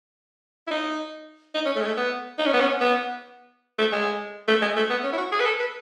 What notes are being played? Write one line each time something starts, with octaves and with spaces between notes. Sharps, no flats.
E4
D#4
D#4
C#4
A3
G#3
A3
B3
D#4
C#4
B3
C#4
B3
A3
G#3
A3
G#3
A3
B3
C#4
E4
F#4
G#4
B4
A4
B4